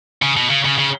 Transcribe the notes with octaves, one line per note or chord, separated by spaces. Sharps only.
C#3
B2
C#3
C#3
C#3